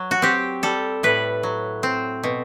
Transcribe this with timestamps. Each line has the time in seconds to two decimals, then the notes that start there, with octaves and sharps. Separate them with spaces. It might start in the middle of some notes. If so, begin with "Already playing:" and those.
Already playing: F#3
0.11 F#4
0.22 C4 G4
0.63 G3 A4
1.03 A2 B4
1.43 F#3
1.83 C4
2.23 B2